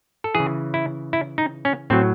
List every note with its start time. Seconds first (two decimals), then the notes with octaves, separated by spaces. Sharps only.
0.24 A4
0.35 C#3 E3 G#4
0.74 E4
1.13 E4
1.38 D#4
1.65 C#4
1.90 A2 F#3 C4